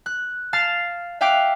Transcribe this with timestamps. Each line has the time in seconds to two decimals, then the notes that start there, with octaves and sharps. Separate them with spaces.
0.06 F#6
0.53 F5 A5 F6 A6 C7
1.21 E5 F5 G5 D6 F#6 D7